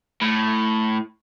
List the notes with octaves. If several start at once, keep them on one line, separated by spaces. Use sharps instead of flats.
A2